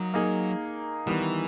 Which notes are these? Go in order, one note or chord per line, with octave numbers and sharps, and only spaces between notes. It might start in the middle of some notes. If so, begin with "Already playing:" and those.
Already playing: F#3 A#3 D#4
A#3 D#4 G#4
D#3 E3 G3 B3